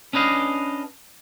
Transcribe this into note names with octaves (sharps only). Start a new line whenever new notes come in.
C#4 D4 B4 D#5 F5